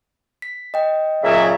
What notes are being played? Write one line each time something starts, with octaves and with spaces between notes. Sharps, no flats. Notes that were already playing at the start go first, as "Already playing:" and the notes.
B6
D#5 G5
A#2 C#3 F#3 E5